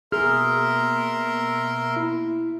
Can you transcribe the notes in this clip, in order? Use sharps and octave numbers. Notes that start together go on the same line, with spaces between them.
B2 A#3 G#4 A#4 E5 C6 F6
E4